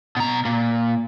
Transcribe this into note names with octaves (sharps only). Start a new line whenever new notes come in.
B2 A#5
A#2